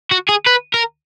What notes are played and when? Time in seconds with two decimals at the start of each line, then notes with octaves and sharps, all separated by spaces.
0.12 F#4
0.29 G#4
0.47 B4
0.74 A#4